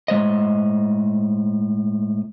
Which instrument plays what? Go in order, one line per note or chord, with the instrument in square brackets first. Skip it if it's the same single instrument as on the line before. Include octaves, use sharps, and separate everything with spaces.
[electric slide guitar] A2 G#3 C5 D#5